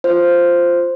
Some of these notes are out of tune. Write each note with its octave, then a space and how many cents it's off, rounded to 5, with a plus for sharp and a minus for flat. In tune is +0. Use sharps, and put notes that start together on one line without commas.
F4 -5 C5 +0